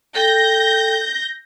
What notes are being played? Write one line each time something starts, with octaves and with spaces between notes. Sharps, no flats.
A4 G5 G6 A#6